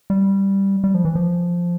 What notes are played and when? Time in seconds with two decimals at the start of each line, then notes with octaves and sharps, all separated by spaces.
0.10 G3
0.84 G3
0.94 F3
1.05 E3
1.15 F3